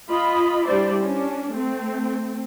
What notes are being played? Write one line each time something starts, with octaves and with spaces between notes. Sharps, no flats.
F4 D#5 B5
G3 D4 E4 C5 D5
C#4 D4
A3 C4